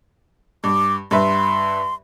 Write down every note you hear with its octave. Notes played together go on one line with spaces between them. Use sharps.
G2 D6
G2 B4 E5 C6